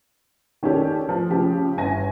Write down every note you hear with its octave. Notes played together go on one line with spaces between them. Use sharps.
D#3 C#4 D4 G4 A4
F3
C#3 F3 G4
G1 G#5 A#6